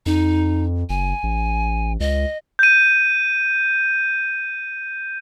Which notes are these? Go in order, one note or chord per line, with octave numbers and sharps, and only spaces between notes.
F2 D#4
F#1 G#5
A1
C#2 D#5
G6 D#7